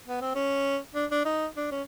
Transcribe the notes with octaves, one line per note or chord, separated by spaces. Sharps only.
B3
C4
C#4
D4
D4
D#4
D4
C#4